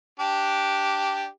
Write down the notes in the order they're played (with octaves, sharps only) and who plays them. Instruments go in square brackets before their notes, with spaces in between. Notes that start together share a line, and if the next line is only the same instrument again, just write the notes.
[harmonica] D4 G4